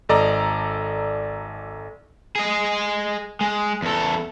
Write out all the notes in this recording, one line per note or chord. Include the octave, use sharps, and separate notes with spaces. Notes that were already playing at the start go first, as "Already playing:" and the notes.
G#1 A4 D5 D#5 A#5
G#4 D#5
G#3
E2 A4